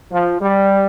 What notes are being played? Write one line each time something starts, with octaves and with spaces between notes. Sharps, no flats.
F3
G3